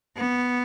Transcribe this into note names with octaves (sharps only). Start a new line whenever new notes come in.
B3